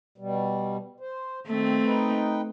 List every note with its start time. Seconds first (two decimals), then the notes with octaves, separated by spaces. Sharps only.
0.18 B2 G3
1.00 C5
1.47 D#3 A3 C4
1.85 D#4 B4 G5